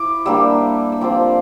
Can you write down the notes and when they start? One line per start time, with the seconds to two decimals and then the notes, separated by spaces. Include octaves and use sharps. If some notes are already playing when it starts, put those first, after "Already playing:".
Already playing: E4 D6
0.26 G3 A#3 D4 E6
0.92 E6
1.01 F3 C4 F4 D6